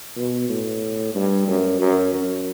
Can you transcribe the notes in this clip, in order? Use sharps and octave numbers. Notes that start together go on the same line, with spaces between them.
B2
A2
G2
F#2
F#2
F#2